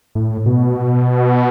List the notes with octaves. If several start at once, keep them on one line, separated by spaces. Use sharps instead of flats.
A2
B2